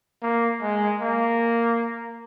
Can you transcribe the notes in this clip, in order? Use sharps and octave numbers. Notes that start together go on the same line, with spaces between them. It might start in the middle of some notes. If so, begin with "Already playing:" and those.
A#3
G#3
A#3